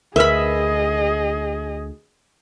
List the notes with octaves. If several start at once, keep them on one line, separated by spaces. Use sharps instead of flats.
D2 G#4 A#4 B4 D#5 E5 B5